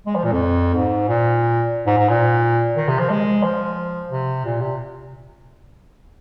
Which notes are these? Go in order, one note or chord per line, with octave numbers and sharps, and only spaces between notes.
G#3
F3
A#2
F2
G#2
A#2
G#2
G#2
A#2
D#3
C3
F3
G#3
F3
C3
A#2
C3